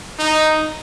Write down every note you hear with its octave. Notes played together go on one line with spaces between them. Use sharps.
D#4